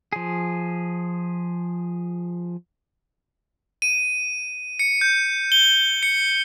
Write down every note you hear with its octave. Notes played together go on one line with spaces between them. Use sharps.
F3 G#4
D#7
C#7
G6
G7
C#7